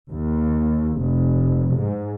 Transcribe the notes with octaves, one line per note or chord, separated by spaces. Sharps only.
D#2
F1
G#2